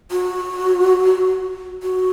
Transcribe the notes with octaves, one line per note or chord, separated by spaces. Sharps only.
F#4
F#4